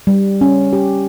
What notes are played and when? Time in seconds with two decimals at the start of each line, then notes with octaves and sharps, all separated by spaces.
0.07 G3
0.41 C#4
0.73 G4